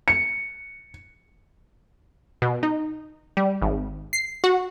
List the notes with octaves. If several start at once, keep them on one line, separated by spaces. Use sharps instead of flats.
C#7
B2
D#4
G3
G#1
C7
F#4